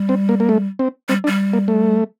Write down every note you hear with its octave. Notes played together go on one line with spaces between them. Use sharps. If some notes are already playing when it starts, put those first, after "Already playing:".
Already playing: G3
C4
A#3
A#3
A3
C4
G3 C4
D4
G3
A#3
A3